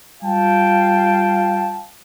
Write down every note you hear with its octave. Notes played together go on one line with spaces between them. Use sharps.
G3 F4 F5 G5 A5